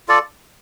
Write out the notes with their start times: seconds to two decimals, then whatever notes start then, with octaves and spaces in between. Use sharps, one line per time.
0.08 F4 A4 D5